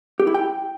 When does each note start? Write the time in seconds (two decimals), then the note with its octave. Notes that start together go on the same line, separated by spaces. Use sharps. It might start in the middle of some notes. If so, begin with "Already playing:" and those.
0.20 G4
0.27 E4
0.34 G5